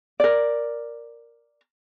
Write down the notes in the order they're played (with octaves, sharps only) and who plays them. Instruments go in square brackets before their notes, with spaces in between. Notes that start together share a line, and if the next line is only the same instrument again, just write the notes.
[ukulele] A#4 D5